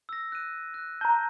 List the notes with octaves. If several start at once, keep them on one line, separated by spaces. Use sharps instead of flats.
E6 A#6
F#6 D#7
F#6
A5 A#5 F#6 G6